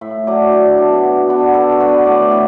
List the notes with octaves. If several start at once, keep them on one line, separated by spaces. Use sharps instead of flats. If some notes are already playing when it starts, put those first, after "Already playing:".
A2 E5
F#3 D4 D5
D3
B3 D4
B2
B3 D4
D3 A4
F#4
B3 D4
B4
A2 D5
E3